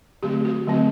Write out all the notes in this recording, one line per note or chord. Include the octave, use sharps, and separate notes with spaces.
D3 F#3 A3 C4 G4
F#4
D3 F#3 A3 C4